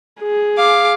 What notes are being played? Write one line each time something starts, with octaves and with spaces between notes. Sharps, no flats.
G#4
F5 D6